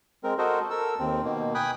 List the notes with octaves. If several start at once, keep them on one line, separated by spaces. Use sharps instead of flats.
G#3 C4 A#4
F#4 A4 A#4 C5 D#5
A4 A#4 E6
D#2 C4
B2 D#3 A#3
G5 G#5 B5 D#6 F#6